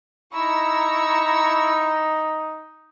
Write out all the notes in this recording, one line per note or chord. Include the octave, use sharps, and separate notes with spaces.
D#4 E4 A#5 C#6 E6